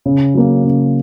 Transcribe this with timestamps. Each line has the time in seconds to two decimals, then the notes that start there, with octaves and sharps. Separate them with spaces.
0.06 C#3
0.34 F#3 A#3
0.64 C#3